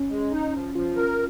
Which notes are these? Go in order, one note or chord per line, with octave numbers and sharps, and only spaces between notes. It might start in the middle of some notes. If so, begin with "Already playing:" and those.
Already playing: C#4
G#3
D#4
F3
F3 F4
A#4